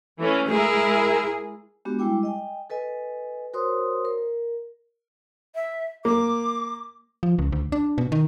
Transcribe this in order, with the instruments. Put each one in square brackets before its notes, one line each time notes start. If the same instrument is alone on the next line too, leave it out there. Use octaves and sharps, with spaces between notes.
[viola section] E3 A3 C#4
[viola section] G#3 E4 A#4 [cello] G#4
[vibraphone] G#3 B3 D4 F#4 G4
G3 G#3 E4 G5 D6
D#5 G5 G#5
A4 B4 D#5 G#5
F#4 A#4 C5 C#5 C6 D#6
A#4
[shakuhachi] E5
[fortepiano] A#3 [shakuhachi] D6
[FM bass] F3
C#2
D2
D4
B2
D#3